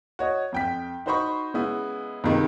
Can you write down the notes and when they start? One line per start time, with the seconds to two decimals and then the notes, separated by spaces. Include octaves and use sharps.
0.19 F#4 C#5 D#5
0.52 F2 G5 B6
1.06 D#4 F#4 C5 D#5 B5 C#6
1.54 C#3 G#3 B3 E4
2.24 C#2 C3 D#3 G#3